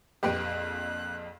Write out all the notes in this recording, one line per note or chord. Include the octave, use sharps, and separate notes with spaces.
A#1 F2 G4 B4 G5 F#6